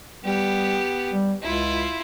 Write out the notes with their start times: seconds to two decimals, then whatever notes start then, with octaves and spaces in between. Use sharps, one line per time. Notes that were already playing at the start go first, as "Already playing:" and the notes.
0.24 G3 B3 G4
1.12 G3
1.43 C#2 E4 F4